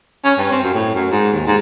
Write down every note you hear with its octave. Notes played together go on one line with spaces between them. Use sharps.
C#4
G2
C4
F#2
A2
F#2
G#2
D#2
G#2